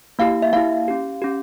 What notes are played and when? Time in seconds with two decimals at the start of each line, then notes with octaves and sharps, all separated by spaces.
0.19 A#3 E4 G4 F5
0.42 E5
0.53 A#3 E4 G4 F5
0.88 C#4 G4
1.22 C#4 G4